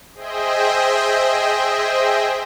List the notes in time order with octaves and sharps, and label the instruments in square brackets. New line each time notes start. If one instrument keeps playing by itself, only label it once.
[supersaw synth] G#4 C5 D#5 E5 G5